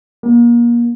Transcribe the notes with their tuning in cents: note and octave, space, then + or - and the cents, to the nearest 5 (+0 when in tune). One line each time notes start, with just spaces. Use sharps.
A#3 +30